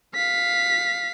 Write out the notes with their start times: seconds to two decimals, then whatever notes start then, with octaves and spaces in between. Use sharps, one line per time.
0.15 F5 B6